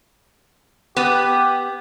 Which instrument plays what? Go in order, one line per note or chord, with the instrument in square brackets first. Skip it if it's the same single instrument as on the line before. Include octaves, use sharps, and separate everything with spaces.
[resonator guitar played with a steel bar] B3 [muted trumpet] G4